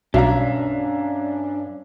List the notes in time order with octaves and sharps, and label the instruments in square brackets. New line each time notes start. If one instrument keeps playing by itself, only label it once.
[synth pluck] B1 B2 [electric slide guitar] G2 C#4 [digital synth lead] D4 [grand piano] E5 F5 A#5